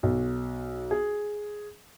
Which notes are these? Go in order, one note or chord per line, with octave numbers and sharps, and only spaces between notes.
B1
G#4